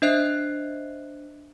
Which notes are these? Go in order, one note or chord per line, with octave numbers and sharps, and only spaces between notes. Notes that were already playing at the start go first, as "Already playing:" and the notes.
D4 C5 D#5 E5 F#6 C7